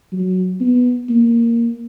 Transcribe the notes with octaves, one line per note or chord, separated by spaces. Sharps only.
F#3
B3
A#3